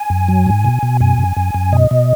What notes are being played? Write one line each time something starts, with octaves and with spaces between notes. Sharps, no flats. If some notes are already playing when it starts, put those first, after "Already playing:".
Already playing: G#5
F#2
F#3
G#2
B2
B2
F#2 G#5
F#2
F#2
F#2
B2 D#5
B2